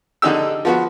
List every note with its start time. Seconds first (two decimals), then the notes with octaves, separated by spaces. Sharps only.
0.22 D3 D4 D#4 G4 E6
0.65 F3 B3 F#4